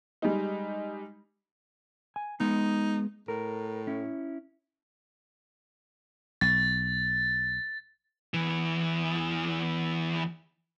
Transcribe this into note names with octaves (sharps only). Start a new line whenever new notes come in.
G3 G#3 D#4
G#5
G#3 B3 D#4
A2 A#4
C#4 E4
B1 A6
E2 E3